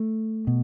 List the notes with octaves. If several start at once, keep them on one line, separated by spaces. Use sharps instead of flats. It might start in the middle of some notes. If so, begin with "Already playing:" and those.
Already playing: A3
B2